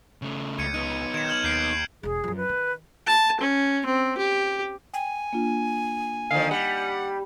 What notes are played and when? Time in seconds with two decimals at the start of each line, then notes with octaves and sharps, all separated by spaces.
0.22 C#3 A3
0.59 C#2 G#6 C#7 D#7
0.74 B3 D#4 D#7
1.14 D#3 G#6 E7
1.29 F6 G#6 F#7
1.44 D#2 G6 C7 D7
2.03 E1 D3 G#4
2.24 F#2 F3
2.36 B4
2.49 D#3
3.07 A5
3.41 C#4
3.86 C4
4.18 G4
4.94 G5 G#5
5.33 A#3 D4 F4
6.31 D3 D#3 F3 F5
6.51 G3 F#5